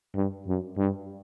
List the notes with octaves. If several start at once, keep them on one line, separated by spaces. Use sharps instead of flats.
G2
F#2
G2